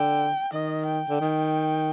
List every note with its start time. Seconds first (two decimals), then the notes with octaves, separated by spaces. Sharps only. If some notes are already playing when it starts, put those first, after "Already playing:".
Already playing: D3 G5
0.53 D#3 D#5
0.87 G5
1.09 D3
1.21 D#3